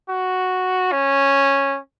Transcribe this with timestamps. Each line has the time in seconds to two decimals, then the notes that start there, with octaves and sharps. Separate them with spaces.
0.09 F#4
0.92 C#4